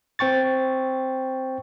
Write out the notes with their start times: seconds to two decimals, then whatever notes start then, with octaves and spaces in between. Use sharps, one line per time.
0.19 C4 G5 C#6 A6